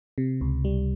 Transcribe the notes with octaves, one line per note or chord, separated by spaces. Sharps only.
C3
C#2
G3